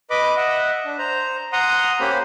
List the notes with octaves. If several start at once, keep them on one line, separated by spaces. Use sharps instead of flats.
B4 D#5 B5 D6
D#5 E5 F#5
D4
C5 A#5
F#5 A#5 C6 D#6
A#3 C#4 G4 C5 B5